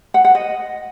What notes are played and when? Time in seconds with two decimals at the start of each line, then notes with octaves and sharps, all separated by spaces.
0.14 F#5
0.25 F#5
0.35 D#5